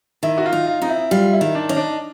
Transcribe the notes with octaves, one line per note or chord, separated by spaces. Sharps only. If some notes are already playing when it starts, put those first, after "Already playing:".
D#3 E4
F#4
F4
D#4
F4
C4 D#4
E4
G3 F4
E4
D#3
D4
C#4 D#4
D4